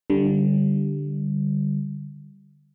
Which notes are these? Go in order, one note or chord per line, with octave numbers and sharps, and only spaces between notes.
D3 G3